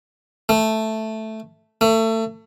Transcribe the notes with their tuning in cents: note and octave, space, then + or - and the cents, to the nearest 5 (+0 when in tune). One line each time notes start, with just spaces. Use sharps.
A3 +0
A3 +30